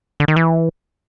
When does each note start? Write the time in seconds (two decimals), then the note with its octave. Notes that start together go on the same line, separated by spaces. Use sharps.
0.20 D3
0.28 D#3
0.36 E3